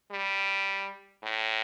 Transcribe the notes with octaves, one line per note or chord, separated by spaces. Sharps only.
G3
A2